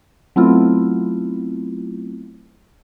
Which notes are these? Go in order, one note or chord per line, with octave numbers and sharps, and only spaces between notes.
F#3 A3 B3 C4 E4 F4